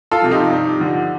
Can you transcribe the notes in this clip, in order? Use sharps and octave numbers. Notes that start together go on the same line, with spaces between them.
F4 A4
C3 F3
D#4 G4
G2
D3 F3